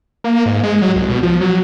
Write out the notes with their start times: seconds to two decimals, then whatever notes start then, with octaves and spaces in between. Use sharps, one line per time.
0.24 A#3
0.46 G#2
0.63 G#3
0.82 F#3
0.96 C2
1.09 B2
1.23 F3
1.41 F#3